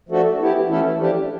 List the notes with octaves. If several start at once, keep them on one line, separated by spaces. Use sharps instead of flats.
F3 A3 D4 F#4 A4
B3 E4 G4
E3 A3 C#4 E4 A4
F3 A3 D4 G4